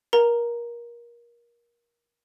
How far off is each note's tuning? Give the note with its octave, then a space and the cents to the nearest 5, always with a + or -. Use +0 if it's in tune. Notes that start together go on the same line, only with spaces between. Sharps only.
A#4 +25 A#5 +0